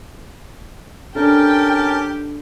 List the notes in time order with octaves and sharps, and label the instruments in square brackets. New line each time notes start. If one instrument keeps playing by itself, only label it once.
[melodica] C#4 A#4 A5 [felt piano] D4 A4 [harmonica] G4 [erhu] G5